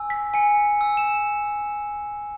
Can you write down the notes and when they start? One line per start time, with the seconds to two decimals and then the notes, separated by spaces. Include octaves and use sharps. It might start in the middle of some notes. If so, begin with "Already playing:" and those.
Already playing: G#5 E6
0.10 B6
0.34 G#5 C#7
0.81 E6
0.97 E7